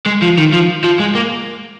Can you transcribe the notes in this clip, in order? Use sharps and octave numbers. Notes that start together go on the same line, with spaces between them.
G#3
F3
D#3
F3
F3
G#3
A#3